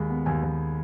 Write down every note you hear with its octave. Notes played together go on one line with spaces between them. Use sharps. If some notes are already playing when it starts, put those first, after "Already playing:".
Already playing: D#2 G#3 B5
B3
D#2 G#5
D#2